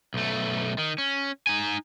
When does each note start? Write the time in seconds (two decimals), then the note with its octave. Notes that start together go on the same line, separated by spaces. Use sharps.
0.14 B1 A3
0.78 D#3
0.98 C#4
1.47 D#4 G#5